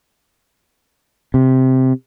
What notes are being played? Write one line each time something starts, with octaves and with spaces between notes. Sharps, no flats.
C3